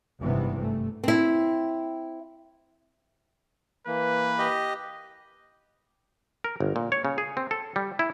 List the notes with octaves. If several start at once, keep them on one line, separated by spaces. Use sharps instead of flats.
G#1 G2 C3 E3 B3
A3
C4 E4
E3 A#3 B4
G4 D#5
A#4
G1
A#2
C#5
C#3
G#4
C4
A4
G3
E4